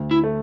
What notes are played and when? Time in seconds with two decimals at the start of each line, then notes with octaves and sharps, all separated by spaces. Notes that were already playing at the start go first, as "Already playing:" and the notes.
Already playing: D2
0.11 E4
0.24 A3